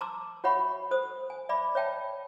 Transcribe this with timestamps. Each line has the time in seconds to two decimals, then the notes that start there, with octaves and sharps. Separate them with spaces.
0.01 A5 A#5 C6 D6 E6
0.44 F#4 C#5 E5 F#5 B5 C#6
0.91 A4 C5 D#6
1.30 G#5
1.49 D5 E5 B5 D6
1.75 C#5 E5 G5 A5